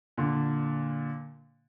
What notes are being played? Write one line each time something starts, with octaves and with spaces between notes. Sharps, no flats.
A#2 D3